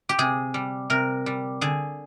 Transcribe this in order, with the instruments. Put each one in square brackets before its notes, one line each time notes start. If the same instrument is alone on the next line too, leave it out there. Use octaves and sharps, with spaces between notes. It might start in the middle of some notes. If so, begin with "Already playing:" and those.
[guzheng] G4
C3 G#4
G3
C3 A#4
G3
D3 G#4